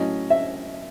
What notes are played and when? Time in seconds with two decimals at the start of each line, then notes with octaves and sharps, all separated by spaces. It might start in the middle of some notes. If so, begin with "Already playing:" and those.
Already playing: A2 F#3 C#4 D#5
0.30 E5